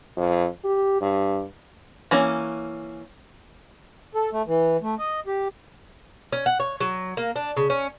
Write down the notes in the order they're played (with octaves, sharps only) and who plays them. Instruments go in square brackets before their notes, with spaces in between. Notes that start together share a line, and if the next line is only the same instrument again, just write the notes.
[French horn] F2
G4
G2
[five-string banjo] E3 A#3 C#4
[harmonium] A4
A3
E3
A3
D#5
G4
[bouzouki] C#4
F#5
C#5
F#3
A#3
D4
C#3
C#4